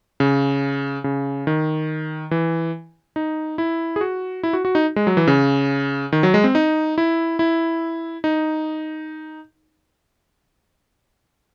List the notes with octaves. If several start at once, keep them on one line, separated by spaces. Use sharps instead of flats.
C#3
C#3
D#3
E3
D#4
E4
G#4
F#4
E4
F#4
F#4
D#4
G#3
F#3
E3
C#3
D#3
F#3
G#3
C4
D#4
E4
E4
D#4